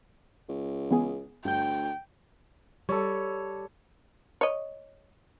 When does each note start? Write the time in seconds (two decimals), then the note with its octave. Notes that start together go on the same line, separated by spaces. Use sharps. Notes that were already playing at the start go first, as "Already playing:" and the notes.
0.49 C#2
0.91 E3 B3 G#4
1.45 D2 G2 G5 G6
2.89 G3 A4 C#5
4.41 C#5 D#5